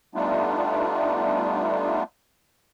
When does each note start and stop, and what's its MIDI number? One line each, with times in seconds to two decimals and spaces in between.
0.15 2.03 55
0.15 2.03 57
0.15 2.03 59
0.15 2.03 62
0.15 2.03 63
0.15 2.03 65